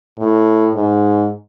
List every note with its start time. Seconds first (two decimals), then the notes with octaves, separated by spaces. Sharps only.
0.19 A2
0.75 G#2